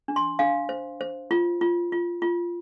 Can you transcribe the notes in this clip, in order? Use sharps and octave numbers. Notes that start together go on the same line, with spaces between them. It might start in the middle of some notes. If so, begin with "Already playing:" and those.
D4
C6
D4 F5
C5
C5
F4
F4
F4
F4